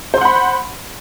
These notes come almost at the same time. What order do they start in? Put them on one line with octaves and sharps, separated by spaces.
C5 C6 F#5 B5